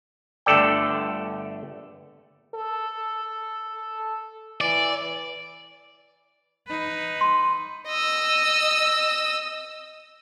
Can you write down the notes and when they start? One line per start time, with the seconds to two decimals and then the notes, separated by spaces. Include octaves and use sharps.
0.46 G1 D3 A3 A4 D5 G5
2.55 A4
4.61 E3 D5
6.67 D#4 B4
7.21 C6
7.88 D#5 E6